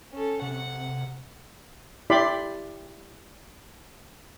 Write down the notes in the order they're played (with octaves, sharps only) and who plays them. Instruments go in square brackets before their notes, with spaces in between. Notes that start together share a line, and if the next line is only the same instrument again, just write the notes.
[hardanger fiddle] C#4 A4
[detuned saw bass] C3 [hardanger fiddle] F#5
[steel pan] E4 G4 D5 B5 C6